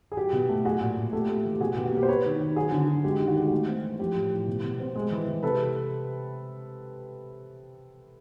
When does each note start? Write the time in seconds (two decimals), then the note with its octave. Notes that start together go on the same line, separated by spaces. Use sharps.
0.12 G#4
0.17 F#3 G4
0.33 B2
0.49 A3
0.65 F#3 F#4 G#4
0.81 A#2
0.97 A#2
1.13 A3 G4 A4
1.29 A3
1.45 E3
1.54 G4
1.60 B2 F#4 G#4
1.73 B2 G4
1.84 F#4
1.92 A#3 G4
2.03 C5
2.09 B3 B4 C#5
2.25 D#3
2.40 D#3
2.56 F#3 F#4 G#4
2.72 D3
2.88 F#3
3.04 G#3 G4
3.20 D#3
3.27 F#4
3.36 G#3 G4
3.45 F#4
3.52 A3
3.68 C4
3.83 E3
3.99 F3 G4
4.15 A2
4.32 A2
4.47 B2
4.63 B2
4.80 C4
4.96 G#3
5.11 E3
5.27 E3
5.43 C3 A4 B4